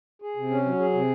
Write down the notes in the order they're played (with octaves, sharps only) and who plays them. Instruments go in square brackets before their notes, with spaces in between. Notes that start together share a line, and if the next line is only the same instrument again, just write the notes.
[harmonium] G#4
C3
C#4
F#3
G#4
C3